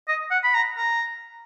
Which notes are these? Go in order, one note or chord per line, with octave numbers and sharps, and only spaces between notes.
D#5
F#5
B5
A#5
A#5